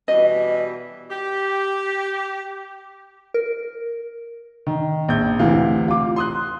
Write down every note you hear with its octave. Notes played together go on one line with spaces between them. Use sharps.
B2 E3 G3 D#5
G4
A#4
D#3
A#1 G6
D2 C3 E3 F5
F4 D6
C6 D#6 F#6